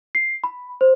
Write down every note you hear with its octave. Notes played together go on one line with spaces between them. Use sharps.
C7
B5
C5